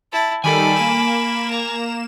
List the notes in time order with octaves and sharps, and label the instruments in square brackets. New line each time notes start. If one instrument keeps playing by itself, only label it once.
[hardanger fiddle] E4 A5
[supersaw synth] D#3 G3 A4 [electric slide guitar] G#5 [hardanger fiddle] B5 D6
[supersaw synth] A#3 E7
[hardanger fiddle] A#5